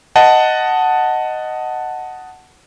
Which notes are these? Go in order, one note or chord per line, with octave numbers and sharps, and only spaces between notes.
D#5 F#5 A5